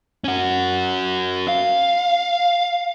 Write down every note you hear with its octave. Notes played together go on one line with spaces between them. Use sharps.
C#4 F#4
F5